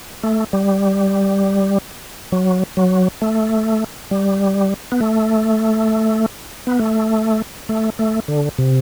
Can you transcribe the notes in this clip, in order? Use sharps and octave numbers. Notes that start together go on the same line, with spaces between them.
A3
G3
F#3
F#3
A3
G3
B3
A3
B3
A3
A3
A3
D3
C3